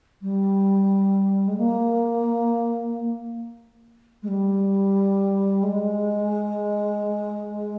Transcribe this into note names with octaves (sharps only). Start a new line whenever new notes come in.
G3
G#3
A#3
G#3
G3
G#3